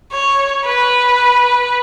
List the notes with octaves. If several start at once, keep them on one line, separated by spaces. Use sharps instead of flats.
C#5
B4